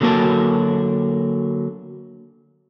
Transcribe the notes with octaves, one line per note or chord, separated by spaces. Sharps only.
D3 F#3 A#3 F#4 A#4 A5